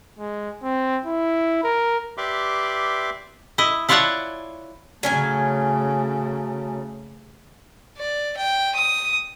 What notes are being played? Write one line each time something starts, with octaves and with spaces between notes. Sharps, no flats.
G#3
C4
E4
A#4
G4 B4 D5 E5 C6 D6
E4 D#5
E4 F4 C#5 D5 F#5 A5
C#3 F#3 A3 C#4 G#5
D5
G5
D#6